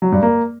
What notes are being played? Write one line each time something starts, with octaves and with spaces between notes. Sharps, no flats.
F#3
G2
A#3